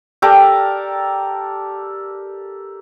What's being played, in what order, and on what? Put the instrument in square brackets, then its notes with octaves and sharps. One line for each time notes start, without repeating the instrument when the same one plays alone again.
[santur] G4 A4 A#4 D5